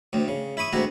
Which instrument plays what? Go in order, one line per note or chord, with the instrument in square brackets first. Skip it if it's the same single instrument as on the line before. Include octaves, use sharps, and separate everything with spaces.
[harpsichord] D2 A2 C4
C#3
E4 B5 C#6 D#6
D2 G#2 C3 E4 F#4 A#5